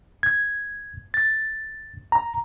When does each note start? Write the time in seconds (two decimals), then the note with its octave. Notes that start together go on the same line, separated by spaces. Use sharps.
0.23 G#6
1.14 A6
2.12 A#5